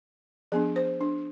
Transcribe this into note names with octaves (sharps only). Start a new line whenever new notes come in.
F3 B3 D4 G#4
C5
D4